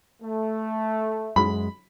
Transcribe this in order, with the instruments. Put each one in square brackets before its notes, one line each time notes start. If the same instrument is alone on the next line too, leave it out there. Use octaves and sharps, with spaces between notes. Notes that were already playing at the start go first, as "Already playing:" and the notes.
[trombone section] A3
[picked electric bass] F#2 G#3 [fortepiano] B5